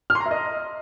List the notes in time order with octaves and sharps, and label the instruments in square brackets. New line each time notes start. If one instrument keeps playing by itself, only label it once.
[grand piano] F6
C6
A#5
E5
D#5